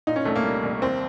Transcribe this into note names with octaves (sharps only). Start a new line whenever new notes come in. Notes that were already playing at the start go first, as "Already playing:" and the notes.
A#2 D#4
C#4
C2 A3
A#3
G3
C2
D#2 C4